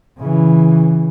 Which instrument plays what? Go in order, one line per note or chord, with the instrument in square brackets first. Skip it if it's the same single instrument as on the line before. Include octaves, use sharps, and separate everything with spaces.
[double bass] C#3 E3